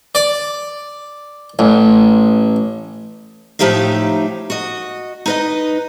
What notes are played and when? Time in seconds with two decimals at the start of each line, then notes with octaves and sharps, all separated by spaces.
0.15 D5
1.59 A1
3.59 A2 F3 D#4 G4 E5 F5
4.50 F#4 D#5
5.26 D#4 B4 D#5